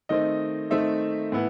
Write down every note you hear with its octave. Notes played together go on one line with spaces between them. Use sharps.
D#3 A3 C4 D#4 D#5
D#3 A3 C4 D#4 E5
A2 E3 B3 E4